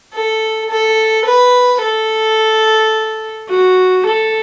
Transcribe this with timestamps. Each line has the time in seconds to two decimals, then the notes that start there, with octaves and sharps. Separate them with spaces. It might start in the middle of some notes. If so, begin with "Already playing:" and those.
0.13 A4
0.69 A4
1.25 B4
1.80 A4
3.49 F#4
4.05 A4